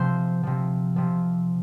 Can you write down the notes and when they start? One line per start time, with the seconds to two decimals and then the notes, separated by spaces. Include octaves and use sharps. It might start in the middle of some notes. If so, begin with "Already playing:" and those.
Already playing: C3 F3 C5
0.43 C3 F3
0.96 C3 F3